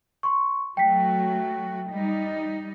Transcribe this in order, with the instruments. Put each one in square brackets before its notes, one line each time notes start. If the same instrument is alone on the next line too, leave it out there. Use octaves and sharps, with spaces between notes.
[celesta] C6 C#6
[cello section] F#3 A3 F#4 [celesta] G5 B6
[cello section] G3 D#4